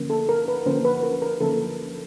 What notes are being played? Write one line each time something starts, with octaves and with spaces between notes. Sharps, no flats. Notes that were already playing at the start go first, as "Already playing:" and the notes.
Already playing: D3 F3 A#3 C#4
A4
A#4
B4
D3 F3 A#3 C#4 C5
B4
A#4
A#4
D3 F3 A#3 C#4 A4